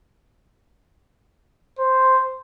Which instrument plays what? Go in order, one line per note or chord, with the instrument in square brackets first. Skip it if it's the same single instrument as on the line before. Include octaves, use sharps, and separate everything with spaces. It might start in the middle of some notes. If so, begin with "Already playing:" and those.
[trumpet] C5